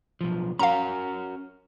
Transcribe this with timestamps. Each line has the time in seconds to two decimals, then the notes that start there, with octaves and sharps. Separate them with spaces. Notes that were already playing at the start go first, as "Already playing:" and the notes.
0.21 B1 F3
0.59 C#4 F#4 A#4 F5 A#5